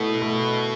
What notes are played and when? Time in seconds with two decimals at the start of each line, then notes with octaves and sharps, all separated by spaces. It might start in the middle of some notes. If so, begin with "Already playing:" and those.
Already playing: B2 A3 E4
0.22 A3